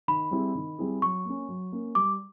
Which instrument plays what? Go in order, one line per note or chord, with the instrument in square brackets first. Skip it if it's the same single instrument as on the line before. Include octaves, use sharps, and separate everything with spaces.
[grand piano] D#3 [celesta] B5
[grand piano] G3 C4 E4 G#4
D#3
G3 C4 E4 G#4
[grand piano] F#3 [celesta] C#6
[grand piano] A#3 C#4
F#3
A#3 C#4
[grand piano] G3 [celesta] D6